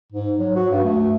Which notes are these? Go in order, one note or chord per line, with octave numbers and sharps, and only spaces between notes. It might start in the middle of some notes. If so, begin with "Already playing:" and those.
G#2
F#3
F#4
G2
A3